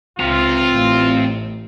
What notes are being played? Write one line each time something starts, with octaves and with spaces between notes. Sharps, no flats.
C#2 C4 F4 A#5
A1 A2